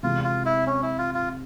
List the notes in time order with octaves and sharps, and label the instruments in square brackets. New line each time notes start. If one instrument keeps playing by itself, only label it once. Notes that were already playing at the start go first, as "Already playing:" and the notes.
[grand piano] C3 E3 G#3 [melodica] F4
[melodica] F4
E4
C#4
E4
F4
F4